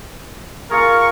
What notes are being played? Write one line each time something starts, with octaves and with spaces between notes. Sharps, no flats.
F4 G#4 A#4 C#6